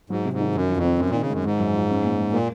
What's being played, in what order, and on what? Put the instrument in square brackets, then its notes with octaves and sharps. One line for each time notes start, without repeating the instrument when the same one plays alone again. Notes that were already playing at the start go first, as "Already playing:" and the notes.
[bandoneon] G#2 [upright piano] F#3
[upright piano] C3
[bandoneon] G#2
[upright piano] D#3
[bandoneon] F#2 [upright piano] F#4
[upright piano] F3
[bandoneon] F2
[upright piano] C4
[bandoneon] F#2 [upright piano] C4
[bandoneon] A#2 [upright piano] D#3
[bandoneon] C#3
[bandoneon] F#2 [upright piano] G#3
[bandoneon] G#2 [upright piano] G#3
[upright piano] F#2
F3
C#4
A#2
G#3
[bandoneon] A#2 [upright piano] A#3